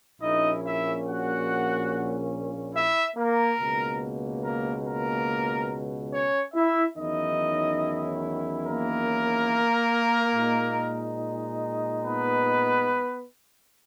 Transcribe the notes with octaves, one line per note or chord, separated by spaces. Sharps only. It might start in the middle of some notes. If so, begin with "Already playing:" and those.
A#1 A#2 A#3 C#4 D#4 E4 D#5
E4 E5
F#4 F#5
E4 E5
A#3 A#4
C#2 B2 A#3
A#3 A#4
A#3 A#4
C#4 C#5
E4 E5
E2 D#3 F#3 C#4 D#4 E4 D#5
A#3 A#4
A#2 G#3 D#4
B3 B4